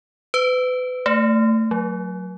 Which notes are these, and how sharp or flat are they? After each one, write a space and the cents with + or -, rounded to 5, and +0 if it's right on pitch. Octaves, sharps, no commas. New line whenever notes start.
B4 +35
A3 +20
F#3 -15